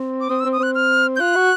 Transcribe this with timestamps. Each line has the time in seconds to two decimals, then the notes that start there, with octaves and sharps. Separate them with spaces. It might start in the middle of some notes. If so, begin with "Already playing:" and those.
Already playing: C4
0.20 D6
0.29 C4 D#6
0.40 E6
0.45 C4
0.52 D#6
0.59 C4 F#6
0.75 F6
1.16 G6
1.20 F4 F#6
1.36 F#4